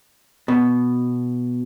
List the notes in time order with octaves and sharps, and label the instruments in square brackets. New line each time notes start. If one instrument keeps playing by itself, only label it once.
[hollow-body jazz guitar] B2